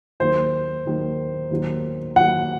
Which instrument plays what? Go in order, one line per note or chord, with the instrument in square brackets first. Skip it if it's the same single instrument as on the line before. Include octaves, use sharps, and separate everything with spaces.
[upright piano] D#2 D#3 F#3 [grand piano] C5
[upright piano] D#2 D#3 F#3
D#2 D#3 F#3
[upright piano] D#2 D#3 F#3 [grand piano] F#5